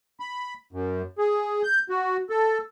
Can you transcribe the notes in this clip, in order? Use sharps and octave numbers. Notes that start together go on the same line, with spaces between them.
B5
F#2
G#4
G6
F#4
A4